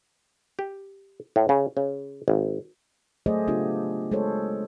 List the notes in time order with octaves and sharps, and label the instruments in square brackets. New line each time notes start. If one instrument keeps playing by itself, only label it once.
[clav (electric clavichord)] G4
A2
C#3
C#3
G#1
[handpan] F#3 A3 G#4 C5 D5 D#5
C#3 B3 D4 F4 G4
G#3 G#4 A4 C5 C#5